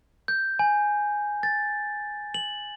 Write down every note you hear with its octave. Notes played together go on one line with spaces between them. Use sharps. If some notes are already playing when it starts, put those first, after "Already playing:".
G6
G#5
A6
F#7